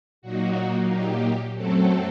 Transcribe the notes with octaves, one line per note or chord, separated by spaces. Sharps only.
A#2 F#3 A#3 D#4 F#4
G4
F#2 F#3 A3 C4 A4